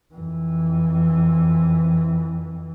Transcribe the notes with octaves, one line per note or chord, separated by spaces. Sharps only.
F2 E3